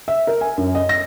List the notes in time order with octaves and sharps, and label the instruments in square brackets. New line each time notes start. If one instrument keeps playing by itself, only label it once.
[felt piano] E5
A#4
G#5
F#2
D#5
A#6